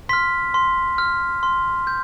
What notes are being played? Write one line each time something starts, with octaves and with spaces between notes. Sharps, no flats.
C6 F6 B6
C6
F6
C6
G6